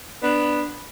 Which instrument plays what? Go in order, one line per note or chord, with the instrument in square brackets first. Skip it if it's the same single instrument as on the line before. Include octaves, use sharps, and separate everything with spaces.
[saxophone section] B3 D4